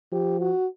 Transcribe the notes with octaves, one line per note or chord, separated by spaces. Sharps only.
F3 G4
F#4